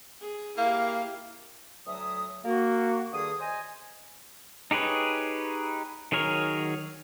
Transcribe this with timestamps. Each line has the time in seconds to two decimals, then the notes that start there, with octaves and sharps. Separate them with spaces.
0.21 G#4
0.57 A#3 E4 G4 F5
1.87 D2 F#3 E5 D#6
2.45 A#3 F#4
3.12 G2 D3 D#3 G#4 D#6
3.40 C5 D#5 G#5
4.71 D#4 G4 G#4 B4 C#5
6.12 D#3 F#3 G#4 A#4 C#5